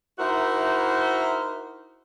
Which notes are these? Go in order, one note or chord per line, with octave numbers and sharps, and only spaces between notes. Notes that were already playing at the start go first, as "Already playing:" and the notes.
D#4 E4 F#4 A#4 C5 E5